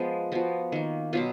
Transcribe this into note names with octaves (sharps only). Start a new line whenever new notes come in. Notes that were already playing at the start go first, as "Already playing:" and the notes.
Already playing: F3 G#3 B3
F3 B3 F#4
D#3 A#3
B2 F#3 B3 F4